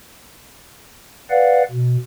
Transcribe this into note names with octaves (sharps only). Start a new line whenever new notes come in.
B4 D5 F5 F#5
B2